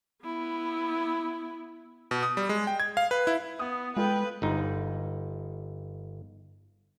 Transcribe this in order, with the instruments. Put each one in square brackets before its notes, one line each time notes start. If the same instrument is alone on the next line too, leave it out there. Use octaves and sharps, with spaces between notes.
[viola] B3 E4
[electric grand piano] B2
D#6
G3
G#3
G5
G#6
F5
B4
E4
[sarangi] B3 [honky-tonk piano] D#6
[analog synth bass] G#3 [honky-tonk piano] F4 A4 [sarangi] B4 [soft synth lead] G5
[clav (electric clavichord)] G1 D#4